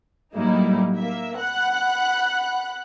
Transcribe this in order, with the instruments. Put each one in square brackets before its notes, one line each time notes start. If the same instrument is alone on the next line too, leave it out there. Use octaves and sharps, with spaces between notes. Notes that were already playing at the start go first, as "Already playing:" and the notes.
[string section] A2 F#3 G3 A#3 D#4 E4
A#3 E5
F#5 B5 F#6